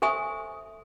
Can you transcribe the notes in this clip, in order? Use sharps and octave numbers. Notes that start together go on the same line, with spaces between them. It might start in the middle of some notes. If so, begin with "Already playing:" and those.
A4 C5 E5 G#5 C#6 D#6